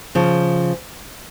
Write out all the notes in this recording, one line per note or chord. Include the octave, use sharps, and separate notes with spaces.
C#3 F3